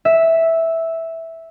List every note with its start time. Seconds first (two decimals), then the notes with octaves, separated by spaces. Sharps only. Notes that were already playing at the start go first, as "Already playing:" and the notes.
0.05 E5